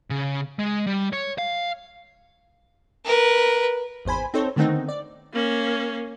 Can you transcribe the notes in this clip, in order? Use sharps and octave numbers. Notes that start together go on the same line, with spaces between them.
C#3
G#3
G3
C#5
F5
A#4 B4
G#1 E2 C5 G#5 B5
C4 D#4 A4 C5 C#5
D3 D#3 A3 B3 C4 D#4
D5
A#3 C#4